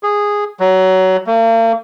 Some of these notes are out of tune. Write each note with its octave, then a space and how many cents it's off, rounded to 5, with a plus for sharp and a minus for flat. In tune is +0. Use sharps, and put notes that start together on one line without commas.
G#4 -10
F#3 +20
A#3 -45